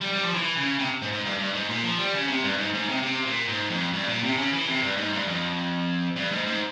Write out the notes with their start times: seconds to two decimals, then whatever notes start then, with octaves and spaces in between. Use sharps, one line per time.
0.01 G3
0.12 G3
0.23 F3
0.34 E3
0.57 C#3
0.79 C3
1.02 G#2
1.12 G#2
1.24 G2
1.38 G2
1.53 G#2
1.69 A#2
1.83 F3
1.99 G3
2.14 C#3
2.28 C3
2.44 G2
2.58 G#2
2.73 G#2
2.88 C3
3.03 C3
3.25 A#2
3.48 G#2
3.70 F2
3.93 G2
4.07 A#2
4.23 C3
4.37 C#3
4.53 E3
4.67 C3
4.82 G2
4.97 G#2
5.13 G2
5.27 F2
6.16 G2
6.32 G#2
6.46 G#2